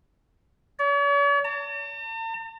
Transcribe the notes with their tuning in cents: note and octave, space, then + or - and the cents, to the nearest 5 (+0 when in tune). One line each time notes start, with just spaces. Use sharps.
C#5 +45
A5 +45